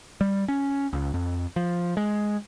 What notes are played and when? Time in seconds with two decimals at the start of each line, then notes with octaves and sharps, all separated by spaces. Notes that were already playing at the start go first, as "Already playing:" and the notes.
0.21 G3
0.48 C#4
0.93 C#2
1.14 F2
1.56 F3
1.97 G#3